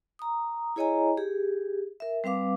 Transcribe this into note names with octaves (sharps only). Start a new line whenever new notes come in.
A#5 D#6
E4 G#4 C#5 D#5 G#5 A#5
G4 G#4
A#4 E5
G3 C4 B4 F5 D6